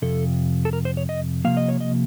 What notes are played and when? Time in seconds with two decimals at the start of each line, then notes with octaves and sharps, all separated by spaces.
0.02 F2 C3 A4
0.65 A4
0.73 A#4
0.85 C5
0.97 C#5
1.09 D#5
1.45 C3 F3 A#3 F5
1.57 D#5
1.68 C#5
1.80 D#5